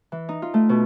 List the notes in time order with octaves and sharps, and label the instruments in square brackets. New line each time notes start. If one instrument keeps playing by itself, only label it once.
[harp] E3
D#4
F4
A3
B2